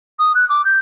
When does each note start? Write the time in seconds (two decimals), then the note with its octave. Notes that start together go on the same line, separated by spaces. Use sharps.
0.19 D#6
0.35 F#6
0.50 D6
0.65 G6